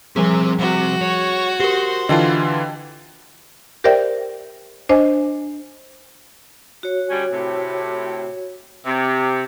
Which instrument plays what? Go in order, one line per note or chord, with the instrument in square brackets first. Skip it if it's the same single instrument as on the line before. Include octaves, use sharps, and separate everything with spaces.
[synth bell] F3 G3 G#4 [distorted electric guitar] C4 E5
[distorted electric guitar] C3 [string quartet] F#4
[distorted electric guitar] C#5
[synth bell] G4 A#4 [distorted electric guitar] C5
[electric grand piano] D3 E3 F4 [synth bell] D#5 G5 A5
[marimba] G4 A#4 C5 D5 E5 G5
D4 C5 D#5 G#5
[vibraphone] F#4 C#5
[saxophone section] D3 G3 C#4
A2 C3
C3